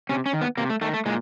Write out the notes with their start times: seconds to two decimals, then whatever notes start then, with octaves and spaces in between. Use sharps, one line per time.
0.09 C3 C#4
0.26 C#4
0.33 D#3
0.42 B3
0.57 C3 A#3
0.70 A3
0.81 D#3 A3
0.94 A3
1.06 A#2 G#3